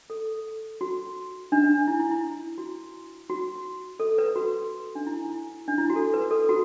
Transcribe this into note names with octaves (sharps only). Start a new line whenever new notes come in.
A4
F#4
D4
D4
E4
E4
E4
F#4
F#4
A4
B4
F#4
D4
E4
E4
D4
E4
F#4
A4
B4
A4
F#4